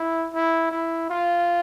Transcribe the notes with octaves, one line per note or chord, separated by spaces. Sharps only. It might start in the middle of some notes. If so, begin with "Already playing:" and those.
Already playing: E4
E4
E4
F4